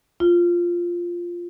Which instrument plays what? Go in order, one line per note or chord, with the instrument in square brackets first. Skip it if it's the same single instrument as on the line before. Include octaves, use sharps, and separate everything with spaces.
[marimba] F4